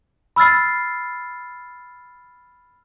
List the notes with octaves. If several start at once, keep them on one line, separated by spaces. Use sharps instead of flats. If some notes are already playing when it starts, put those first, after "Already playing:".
B5 E6 F6 A6 C7